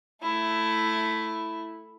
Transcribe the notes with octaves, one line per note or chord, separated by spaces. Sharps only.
A3 E4